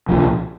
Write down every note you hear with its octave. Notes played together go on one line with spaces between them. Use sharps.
C2 A#2 F3